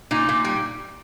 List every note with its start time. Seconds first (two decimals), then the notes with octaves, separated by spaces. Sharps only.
0.11 A#2 D#4
0.29 A#2
0.45 G3